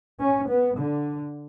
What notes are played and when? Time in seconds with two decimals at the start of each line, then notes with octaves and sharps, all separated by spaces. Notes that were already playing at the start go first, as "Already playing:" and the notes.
0.20 C#4
0.49 B3
0.78 D3